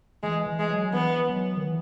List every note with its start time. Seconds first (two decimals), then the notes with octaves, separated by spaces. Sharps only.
0.23 E3 G#3
0.47 E3
0.59 G#3
0.70 F#3
0.93 E3 B3
1.30 F#3
1.57 D#3
1.65 E3